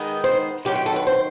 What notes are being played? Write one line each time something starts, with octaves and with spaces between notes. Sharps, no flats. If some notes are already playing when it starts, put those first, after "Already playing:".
Already playing: D#3 G#3 B3 D#4
C5
F#2 D#3 F#3 G4
G4
A4
B4
C5